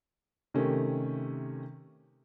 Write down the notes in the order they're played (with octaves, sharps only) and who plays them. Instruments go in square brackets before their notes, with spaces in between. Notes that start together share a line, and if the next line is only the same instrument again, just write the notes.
[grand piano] C3 D#3 A3 C#4 G4